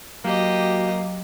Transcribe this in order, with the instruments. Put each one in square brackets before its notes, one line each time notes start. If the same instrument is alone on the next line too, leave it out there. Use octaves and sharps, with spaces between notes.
[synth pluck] F#3 [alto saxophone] A#3 [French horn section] F#4 [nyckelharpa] G4 D#5